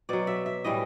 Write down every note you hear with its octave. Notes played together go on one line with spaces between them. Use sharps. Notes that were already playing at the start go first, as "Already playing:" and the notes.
B2 F#3 D5
E5
E5
A2 E3 G3 D#5